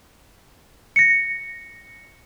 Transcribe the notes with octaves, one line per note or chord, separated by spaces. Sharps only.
A#6 C#7